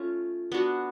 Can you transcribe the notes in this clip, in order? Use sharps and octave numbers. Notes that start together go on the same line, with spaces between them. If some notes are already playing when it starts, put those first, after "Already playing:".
Already playing: A3 C#4 F4
B3 D4 F#4